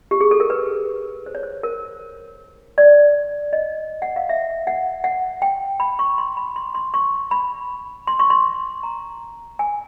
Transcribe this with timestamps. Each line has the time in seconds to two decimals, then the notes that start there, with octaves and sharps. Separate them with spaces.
0.11 G4
0.21 G#4
0.31 A4
0.40 A#4
0.50 B4
1.26 C5
1.35 C#5
1.43 C5
1.63 A#4
2.78 D5
3.53 D#5
4.02 F#5
4.16 F5
4.29 E5
4.67 F#5
5.04 F#5
5.42 G5
5.80 B5
5.99 C#6
6.18 C6
6.37 B5
6.56 C6
6.75 C6
6.94 C#6
7.31 B5
8.07 C6
8.19 C#6
8.30 C6
8.83 A#5
9.59 G#5